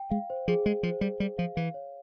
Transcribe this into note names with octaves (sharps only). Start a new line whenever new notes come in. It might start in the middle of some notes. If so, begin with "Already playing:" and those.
Already playing: G5
G#3 F5
C5
F3 G#4
G#3 G#4
F3 C5
G3 G#4
G3 G#4
F3 F5
E3 F5
C#5